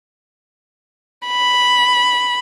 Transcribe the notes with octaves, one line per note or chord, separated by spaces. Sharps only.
B5